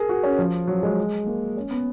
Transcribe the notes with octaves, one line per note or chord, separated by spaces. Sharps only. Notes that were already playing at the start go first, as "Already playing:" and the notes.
Already playing: G#4 A#4
F#4
C#4
F3
F#3
G#3
A#3
C#4
B3